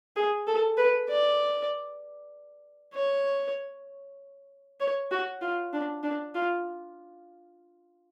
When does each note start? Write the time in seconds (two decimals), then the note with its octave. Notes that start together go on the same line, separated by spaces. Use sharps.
0.16 G#4
0.47 A4
0.78 B4
1.09 D5
2.94 C#5
4.80 C#5
5.11 F#4
5.42 F4
5.73 D4
6.03 D4
6.35 F4